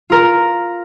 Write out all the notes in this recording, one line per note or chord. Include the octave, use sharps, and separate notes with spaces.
F4 A#4